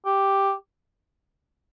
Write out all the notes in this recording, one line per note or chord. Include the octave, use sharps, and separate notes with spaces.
G4